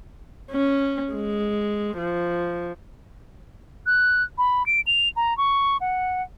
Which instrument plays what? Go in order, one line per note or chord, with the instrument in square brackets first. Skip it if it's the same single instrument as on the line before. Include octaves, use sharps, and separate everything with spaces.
[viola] C#4
G#3
F3
[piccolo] F#6
B5
D7
F7
A#5
C#6
F#5